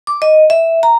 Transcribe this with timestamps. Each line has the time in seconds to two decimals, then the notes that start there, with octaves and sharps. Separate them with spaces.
0.07 D6
0.22 D#5
0.50 E5
0.83 A#5